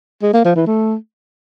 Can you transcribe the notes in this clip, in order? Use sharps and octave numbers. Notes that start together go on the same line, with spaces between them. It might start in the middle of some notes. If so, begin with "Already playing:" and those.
G#3
A#3
F3
E3
A3